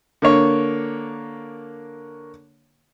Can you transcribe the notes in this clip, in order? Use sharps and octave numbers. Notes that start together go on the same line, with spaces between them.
D3 A#3 C#5